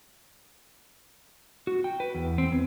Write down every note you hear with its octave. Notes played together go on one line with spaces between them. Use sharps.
F#4
G5
B4
E2
C4
E2